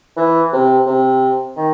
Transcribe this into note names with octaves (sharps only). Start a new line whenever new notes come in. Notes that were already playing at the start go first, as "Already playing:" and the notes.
E3
C3
C3
D#3